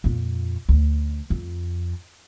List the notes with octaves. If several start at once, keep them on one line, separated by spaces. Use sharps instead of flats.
F2 A#2
D2
F2